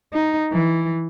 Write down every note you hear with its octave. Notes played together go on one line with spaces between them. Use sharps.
D#4
E3